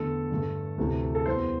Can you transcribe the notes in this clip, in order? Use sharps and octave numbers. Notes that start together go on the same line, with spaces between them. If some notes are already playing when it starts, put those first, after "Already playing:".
Already playing: E2 D3 A3 A4
G2 D3 A3
D2 C3 E3 A3
A4
E2 E3 G3 C5